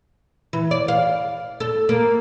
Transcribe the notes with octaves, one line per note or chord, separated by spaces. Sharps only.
E3
D5
F5
A4
A#3